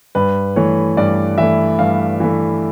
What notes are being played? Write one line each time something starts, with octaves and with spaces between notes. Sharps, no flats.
G2 B4
E3 A3 C#5
G2 D5
E3 A3 E5
G2 F5
E3 A3